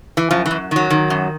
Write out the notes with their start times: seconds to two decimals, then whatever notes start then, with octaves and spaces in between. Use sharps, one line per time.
0.17 E3
0.31 F#2 F3
0.46 E3
0.51 F#2
0.71 D#3 F#3
0.90 D#3
1.10 F#2